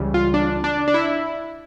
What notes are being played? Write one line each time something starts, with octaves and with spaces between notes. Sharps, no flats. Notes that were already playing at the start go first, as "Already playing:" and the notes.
Already playing: C#2 C#3 E3 G3
F4
D4
D4
D4
E4